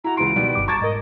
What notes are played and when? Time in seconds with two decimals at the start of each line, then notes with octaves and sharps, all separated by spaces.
0.04 E4 F#4 A#5
0.17 C#2 E3 C6 D7
0.36 B2 D#3 G3
0.55 G1 G2 D6
0.68 A5 A#5 C#6 D6 G#6 A6
0.81 G#2 A#4 D#5